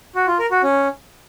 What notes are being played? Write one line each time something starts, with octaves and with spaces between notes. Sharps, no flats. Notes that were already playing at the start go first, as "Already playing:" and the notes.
F#4
F4
A#4
F#4
C#4